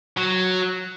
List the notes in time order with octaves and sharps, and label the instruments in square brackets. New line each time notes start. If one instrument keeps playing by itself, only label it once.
[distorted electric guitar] F#3